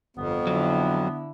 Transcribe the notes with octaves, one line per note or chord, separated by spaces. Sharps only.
G1 F2 B3
D3 F#3 E4